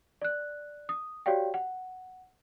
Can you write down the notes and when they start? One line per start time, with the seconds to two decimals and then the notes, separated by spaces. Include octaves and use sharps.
0.22 D5 F#6
0.89 D#6
1.26 F#4 G4 C#5 D5 F5 G5
1.54 F#5